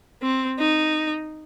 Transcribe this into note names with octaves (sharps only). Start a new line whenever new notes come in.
C4
D#4